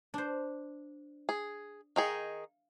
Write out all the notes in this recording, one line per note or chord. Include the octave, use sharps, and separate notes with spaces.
D4 C5
G#4
D#3 D#4 G#4 F5